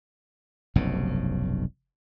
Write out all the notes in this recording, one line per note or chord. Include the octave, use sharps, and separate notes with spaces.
F1 B1 G2 C#3